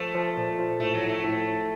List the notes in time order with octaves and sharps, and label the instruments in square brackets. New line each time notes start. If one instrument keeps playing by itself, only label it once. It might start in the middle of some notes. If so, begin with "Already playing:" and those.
Already playing: [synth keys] F3 [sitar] A3
[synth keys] F3
A#2
F3
[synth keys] A2 [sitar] A3
[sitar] F#3
[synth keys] A2
[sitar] A3
[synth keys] A2
A2